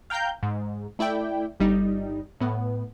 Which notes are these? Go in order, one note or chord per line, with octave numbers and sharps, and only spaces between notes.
F5 G5 A#5 F6 G6
G#2
A3 E4 D5 G5
G1 G3 D#4
A2 B3